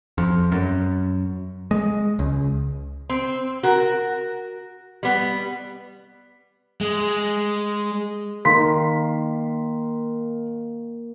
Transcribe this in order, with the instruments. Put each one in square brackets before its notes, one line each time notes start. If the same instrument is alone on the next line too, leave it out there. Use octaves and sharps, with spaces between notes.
[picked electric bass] F2
F#2
G#3
C#2
[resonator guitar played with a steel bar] C4
F#4 A#4
G3 B3
[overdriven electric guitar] G#3
[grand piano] D#3 C6 B6 [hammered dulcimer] A#3